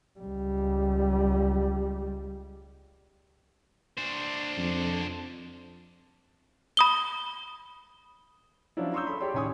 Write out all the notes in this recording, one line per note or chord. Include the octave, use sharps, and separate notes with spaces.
C#2 G3
D4 C5
F2
B5 D#6 G7
F3 F#3 C#4 D4 E4
A#5 C6 C#6 D#6 E6 G6
A4 C#5 B5
G4 C#5 D5 B5 C6
A1 D#3 C#5 G#5 C#6 D#6